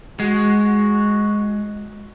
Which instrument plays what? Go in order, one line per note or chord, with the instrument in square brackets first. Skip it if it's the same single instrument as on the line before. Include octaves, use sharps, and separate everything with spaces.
[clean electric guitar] G#3 [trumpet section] F#4